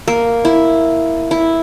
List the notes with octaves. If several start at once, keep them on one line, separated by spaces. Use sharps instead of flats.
A#3
E4
E4